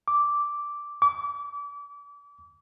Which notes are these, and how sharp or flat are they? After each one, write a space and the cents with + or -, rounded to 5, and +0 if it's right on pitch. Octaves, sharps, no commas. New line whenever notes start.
D6 -5
D6 -35